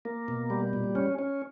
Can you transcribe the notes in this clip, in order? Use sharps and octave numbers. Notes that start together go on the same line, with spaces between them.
A#3
B2
G3
A#2
C#4
C#4